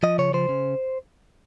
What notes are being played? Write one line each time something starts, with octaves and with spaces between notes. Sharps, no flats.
F3 D#5
C#3 C#5
F3 C5
C#3